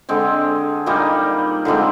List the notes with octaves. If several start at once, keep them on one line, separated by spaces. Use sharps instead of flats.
D3 G#3 C4
A#2 G3 A#3 D#4
D3 F3 G#3 C4